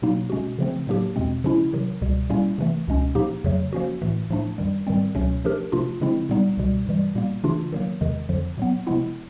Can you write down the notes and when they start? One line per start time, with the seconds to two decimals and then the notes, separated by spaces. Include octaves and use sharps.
0.02 B2 F#3 A#3 D#4
0.30 B2 G#3 C#4 F#4
0.58 C#3 F3 A3 C4
0.87 A2 F#3 A#3 D4 G4
1.16 E2 B2 G#3 C4
1.44 C#3 F3 G#3 C#4 E4
1.73 C3 D#3 F#3
2.02 C#2 B2 G3
2.30 A#2 G3 A#3 C#4 E4
2.58 C3 E3 A3
2.88 C#2 B2 G#3 C#4
3.15 A#2 F3 A#3 D#4 G4
3.44 F2 C#3 F#3 A3
3.73 F3 A#3 C#4 F#4
4.02 A2 E3 A3
4.30 A2 F3 A3 D4
4.58 F#2 D#3 G3
4.87 G#2 D#3 G3 C4
5.15 C#2 B2 F#3 A3 C#4
5.44 F3 A3 D4 G4 A#4
5.72 C3 F3 A3 D4 F4
6.01 C#3 F3 G#3 C4 E4
6.29 A#2 G3 B3 D#4
6.57 C#2 B2 G3
6.86 G2 E3 G3
7.15 A#2 G3 A#3
7.44 C#3 E3 A3 D4 F4
7.72 D#3 F#3 A#3
8.01 E2 C3 D#3 G#3
8.29 F2 D3 F3
8.57 A#2 F#3 B3
8.87 C3 F3 G#3 B3 E4